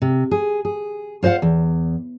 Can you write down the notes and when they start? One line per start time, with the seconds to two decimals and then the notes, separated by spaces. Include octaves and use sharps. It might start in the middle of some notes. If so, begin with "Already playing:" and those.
0.02 C3
0.31 G#4
0.65 G#4
1.23 F4 C5 D#5 F5 F#5
1.42 E2